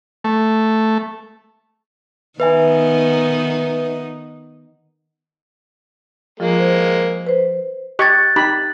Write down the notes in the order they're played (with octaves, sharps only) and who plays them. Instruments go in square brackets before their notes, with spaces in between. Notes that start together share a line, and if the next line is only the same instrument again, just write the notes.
[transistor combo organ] A3
[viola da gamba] D#3 B3 D#4 [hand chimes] B4 E5 G#5
[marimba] F3 F4 [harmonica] G#3 A#3
[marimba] C5
B4 C5
[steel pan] G4 D#5 C#6 [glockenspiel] F#6 G#6 A6
[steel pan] D#4 G4 B5